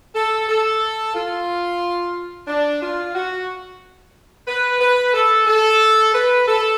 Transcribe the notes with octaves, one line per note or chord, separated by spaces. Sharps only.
A4
A4
F4
D4
F4
F#4
B4
B4
A4
A4
B4
A4